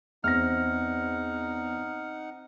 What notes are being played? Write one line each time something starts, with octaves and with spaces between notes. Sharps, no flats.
E2 C4 D#4 E5 F#5 F6 A#6